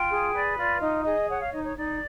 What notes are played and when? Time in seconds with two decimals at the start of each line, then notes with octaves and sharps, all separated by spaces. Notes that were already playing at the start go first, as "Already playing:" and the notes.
Already playing: F4 G5
0.09 G#4
0.32 B4 D5
0.56 F4 D5
0.80 D#4 D#5
1.03 G#4 D#5
1.27 C#5 F#5
1.40 F5
1.51 D#4 D#5
1.63 C#5
1.75 D#4 D5